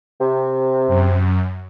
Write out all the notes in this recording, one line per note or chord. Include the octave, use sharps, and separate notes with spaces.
C3
F#2